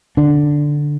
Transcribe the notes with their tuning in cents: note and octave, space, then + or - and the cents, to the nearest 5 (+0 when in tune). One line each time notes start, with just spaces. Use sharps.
D3 +0 D4 +0